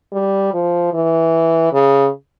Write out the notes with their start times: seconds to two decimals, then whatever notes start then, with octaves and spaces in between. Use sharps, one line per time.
0.13 G3
0.54 F3
0.93 E3
1.72 C#3